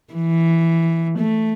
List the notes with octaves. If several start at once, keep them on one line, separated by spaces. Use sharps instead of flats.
E3
A3